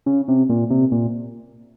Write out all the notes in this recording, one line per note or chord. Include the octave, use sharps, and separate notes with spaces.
C#3
C3
A#2
C3
A#2